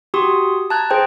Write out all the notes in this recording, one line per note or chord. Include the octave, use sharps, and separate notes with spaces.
F#4 G4 C6 D#6
A5 A#5 F#6 G#6
G#4 C5 G5 A5